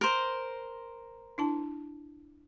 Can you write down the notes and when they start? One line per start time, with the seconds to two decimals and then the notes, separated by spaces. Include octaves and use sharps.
0.01 A#4 C5
1.38 D4 E4 A5